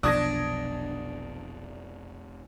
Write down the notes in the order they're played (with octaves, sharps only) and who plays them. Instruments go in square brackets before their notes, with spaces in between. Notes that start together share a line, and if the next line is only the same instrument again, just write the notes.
[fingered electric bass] F1 B3 [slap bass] B1 F3 [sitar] D4 [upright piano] D#6 G#6 A#6